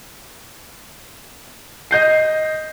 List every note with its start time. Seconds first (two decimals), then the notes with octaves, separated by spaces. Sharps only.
1.91 D#5 G6 C7